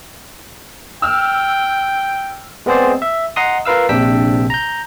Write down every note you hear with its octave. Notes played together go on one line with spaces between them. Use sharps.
G5 E6 F6
G#3 B3 C4 G#4 C5 D5
E5
D#5 F#5 A#5 C6 D#6
F4 A#4 B4 F5 E6
A#1 C3 D4 G5 E6 B6
A#5 G6